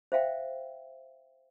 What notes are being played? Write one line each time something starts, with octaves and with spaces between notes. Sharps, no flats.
C5 E5 F5 G5